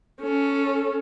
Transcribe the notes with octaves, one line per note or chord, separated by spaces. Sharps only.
C#4 A4